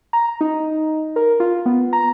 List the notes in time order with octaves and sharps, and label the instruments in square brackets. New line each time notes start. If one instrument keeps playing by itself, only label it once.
[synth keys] A#5
D#4
A#4
F4
B3
A#5